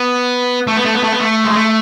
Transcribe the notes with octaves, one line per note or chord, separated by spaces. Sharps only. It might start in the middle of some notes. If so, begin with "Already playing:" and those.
Already playing: B3
A3
B3
A3
B3
A3
B3
A3
G#3
A3